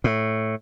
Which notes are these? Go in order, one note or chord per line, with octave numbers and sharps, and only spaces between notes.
A2